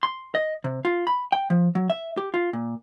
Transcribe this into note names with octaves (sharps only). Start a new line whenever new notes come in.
C6
D#5
C3
F4
B5
G5
F3
F#3
E5
G4
F4
A#2